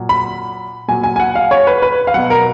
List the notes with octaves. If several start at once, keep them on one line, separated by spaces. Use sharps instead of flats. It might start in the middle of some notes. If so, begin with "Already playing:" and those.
Already playing: A#2 F#3
B5
A#2 F#3 G#5
G#5
G#5
F#5
F5
C#5
B4
B4
F5
B2 F#3 F#5
A#4